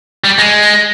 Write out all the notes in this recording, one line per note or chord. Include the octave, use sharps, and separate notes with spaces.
G3
G#3